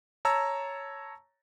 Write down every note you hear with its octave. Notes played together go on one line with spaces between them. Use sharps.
C#5 A5 A#5 E6